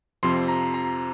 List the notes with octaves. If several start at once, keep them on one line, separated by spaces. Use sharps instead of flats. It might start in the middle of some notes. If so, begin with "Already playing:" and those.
F2 C3 F3 C4 C6
A#5
A#5